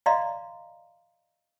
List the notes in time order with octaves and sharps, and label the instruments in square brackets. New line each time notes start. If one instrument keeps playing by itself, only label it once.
[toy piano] D5 D#5 F5 A#5 C6